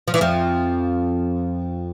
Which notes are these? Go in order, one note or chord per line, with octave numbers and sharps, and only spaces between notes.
F3
E3
F2 F3